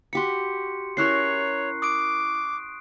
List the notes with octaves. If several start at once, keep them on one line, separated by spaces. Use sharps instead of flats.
F#4 G4 B5 C6 C#7
C#4 E4 A#4 C#5 C#6 F#6 C7
D6 D#6 D7